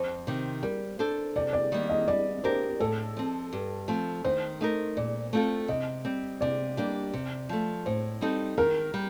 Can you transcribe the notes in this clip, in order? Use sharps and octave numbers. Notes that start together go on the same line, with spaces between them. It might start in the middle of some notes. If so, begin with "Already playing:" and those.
Already playing: F2 C5
C3 D#3
G3 A#4
D4 A4 C5
C3 D5
D5
D#3 G3 A#3
D#5
G3 D5
D4 G4 A#4 C5
A2 A4
F3 C4
G2
F3 A3 C4
D#3 C5
A3 D#4 A#4
A#2 D5
A3 C4 F4 A4
C3 D#5
G3 C4
C3 D5
G3 A#3 D4 G4
C3
F3 A3
A2 C5
G3 C4 D#4 A4
D#3 A#4
G3